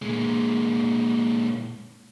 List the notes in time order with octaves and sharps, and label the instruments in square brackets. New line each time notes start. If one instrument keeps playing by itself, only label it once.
[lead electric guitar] A#2 G#3